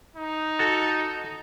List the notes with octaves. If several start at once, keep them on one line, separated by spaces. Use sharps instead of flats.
D#4
F#4 A4